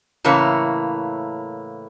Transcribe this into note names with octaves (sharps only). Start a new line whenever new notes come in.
A2 C#3 E3 A#3 C#5